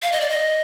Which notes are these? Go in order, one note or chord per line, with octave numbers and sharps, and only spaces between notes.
F5
D#5
D5
D#5